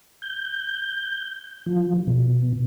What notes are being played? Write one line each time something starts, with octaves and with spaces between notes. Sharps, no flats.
G6
F3
B2